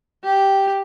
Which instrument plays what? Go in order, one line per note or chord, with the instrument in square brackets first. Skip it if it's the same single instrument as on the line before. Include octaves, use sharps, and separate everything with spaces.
[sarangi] G4